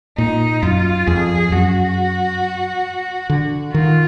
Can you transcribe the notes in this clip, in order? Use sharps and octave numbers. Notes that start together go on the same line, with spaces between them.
A#2 D#4
F#2 F4
F2 G#4
F#2 F#4
D3
D#3 F4